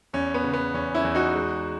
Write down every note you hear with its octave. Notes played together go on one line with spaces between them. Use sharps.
E2 C#4
B3
C#3
B3
E2 C#4
C#4 E4
E2
D#4 F#4
G#3